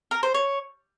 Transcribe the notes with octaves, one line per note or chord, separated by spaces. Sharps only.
A#4
C5
C#5